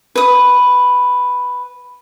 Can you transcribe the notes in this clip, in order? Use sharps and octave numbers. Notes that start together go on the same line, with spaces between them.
B4 D#6